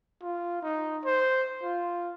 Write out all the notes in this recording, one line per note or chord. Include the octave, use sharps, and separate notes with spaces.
F4
D#4
C5
F4